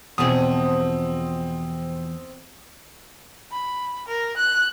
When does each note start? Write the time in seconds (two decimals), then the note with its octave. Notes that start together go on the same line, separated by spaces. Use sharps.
0.18 E2 B2 F3 C4 G#4 D#6
3.51 B5
4.08 A#4
4.36 F#6